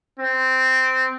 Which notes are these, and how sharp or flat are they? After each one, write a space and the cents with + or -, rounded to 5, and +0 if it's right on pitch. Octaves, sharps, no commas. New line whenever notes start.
C4 -10